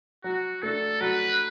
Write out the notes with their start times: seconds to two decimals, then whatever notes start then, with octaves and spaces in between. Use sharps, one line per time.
0.24 F#3 F#4
0.62 A3 D4 A4
1.01 F#3 B4